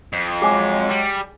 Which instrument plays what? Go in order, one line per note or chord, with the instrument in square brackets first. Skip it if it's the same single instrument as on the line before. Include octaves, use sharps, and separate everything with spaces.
[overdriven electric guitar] F2
[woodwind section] F#3 G#3 [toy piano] G#4 G#5 D6
[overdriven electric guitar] G3